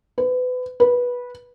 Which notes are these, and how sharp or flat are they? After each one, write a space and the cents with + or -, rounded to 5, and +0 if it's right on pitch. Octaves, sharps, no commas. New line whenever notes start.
B4 +30
B4 -15